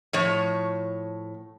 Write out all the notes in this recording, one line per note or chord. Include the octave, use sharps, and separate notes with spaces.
A2 F3 C#5